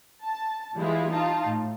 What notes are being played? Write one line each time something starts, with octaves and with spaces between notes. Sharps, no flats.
A5
E3 G3 G#3 E4 F4
D#4 F4 A5
A2